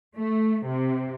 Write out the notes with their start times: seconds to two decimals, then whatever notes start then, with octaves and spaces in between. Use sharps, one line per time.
0.17 A3
0.65 C3